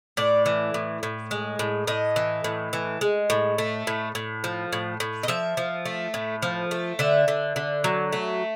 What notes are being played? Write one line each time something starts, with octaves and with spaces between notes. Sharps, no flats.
A2 D5
E3
A2
A2
G#3
A2
A2 D#5
E3
A2
E3
G#3
A2
A3
A2
A2
F3
A2
A2
D#5
F3 E5
F3
A3
A2
F3
A3
D3 E5
D3
D3
F#3
A3